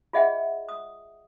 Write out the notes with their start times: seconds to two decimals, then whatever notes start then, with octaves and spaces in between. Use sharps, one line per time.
0.13 F4 G#4 D#5 E5 F#5 G5
0.69 D#6